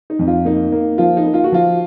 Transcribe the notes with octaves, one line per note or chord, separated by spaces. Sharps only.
D#4
F2
F4
A#3 D#4
A#3
F3 F4
D#4
A#3
F4
F#4
F3 F4